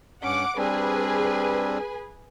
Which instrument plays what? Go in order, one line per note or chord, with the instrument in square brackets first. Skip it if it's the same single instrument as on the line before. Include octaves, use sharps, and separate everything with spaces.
[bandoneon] G2 C#4 [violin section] F#5 D6
[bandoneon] G3 C4 D4 [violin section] G#4 B4 G#5